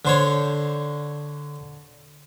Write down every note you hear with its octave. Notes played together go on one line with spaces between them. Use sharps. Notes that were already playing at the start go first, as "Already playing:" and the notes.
D3 C5 C#5